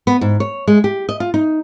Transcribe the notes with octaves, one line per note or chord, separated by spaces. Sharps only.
B3
G#2
C#5
G#3
G4
D#5
F4
D#4